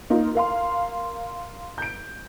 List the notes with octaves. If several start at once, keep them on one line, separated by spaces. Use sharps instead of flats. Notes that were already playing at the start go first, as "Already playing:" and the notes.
A#3 D#4 F4
A#4 F5 C6
G6 D7